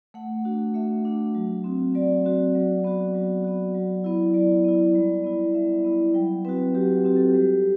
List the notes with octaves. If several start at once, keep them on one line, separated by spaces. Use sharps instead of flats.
A3 F#5
D4 F#4
A3 E5
D4 F#4
F#3
C4 F#4
F#3 D5
C4 F#4
F#3
B3 F#4
F#3
B3 F#4
F#3
B3 E4
F#3 D5
B3 E4
G3
B3 E4
G3 E5
B3 E4
F#3 G5
C4 F#4 B4
F#3 G4
C4 F#4 G4
A4
G3 G4